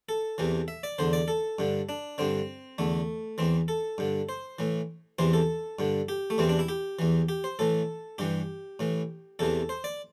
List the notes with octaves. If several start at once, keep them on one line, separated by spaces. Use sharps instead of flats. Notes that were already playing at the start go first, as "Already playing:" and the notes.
A4
E2 C3 E3
E5
D5
E2 D3 C5
D5
A4
G2 D3
D4
G2 D3 C4
E2 D3 A3
E2 E3 C4
A4
G2 D3
C5
A2 E3
E2 C3 E3 C5
A4
G2 D3
G4
A3
E2 C3 E3 C4
D4
E4
G4
E2 E3
G4
C5
A2 E3 A4
G2 E3 G4
A2 E3
E2 C3 E3 A4
C5
D5